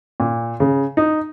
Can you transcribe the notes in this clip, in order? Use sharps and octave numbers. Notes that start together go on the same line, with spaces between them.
A#2
C#3
D#4